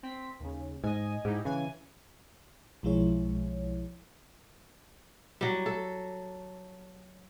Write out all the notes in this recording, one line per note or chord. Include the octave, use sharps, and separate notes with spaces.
C4 B6
D#2 C#3
G#2 D#5 G#5
G#2 D#4 E4 G4
C#3 E3 G#5
B1 F3 G#3 E4 C#5
F#3 G3
A4